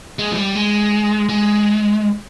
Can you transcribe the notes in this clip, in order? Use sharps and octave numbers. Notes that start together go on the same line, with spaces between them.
G#3
F3
G3
G#3
G#3